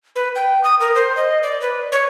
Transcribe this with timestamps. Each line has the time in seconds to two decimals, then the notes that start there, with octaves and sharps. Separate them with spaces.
0.16 B4
0.35 G5
0.64 D#6
0.80 A#4
0.95 C5
1.17 D#5
1.43 D5
1.61 B4
1.92 C#5